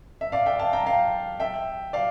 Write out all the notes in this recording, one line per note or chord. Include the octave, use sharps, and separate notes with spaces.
E5
D5 F5
E5 G5
F5 A5
G5 A#5
F5 A5
E5 G5
D5 F5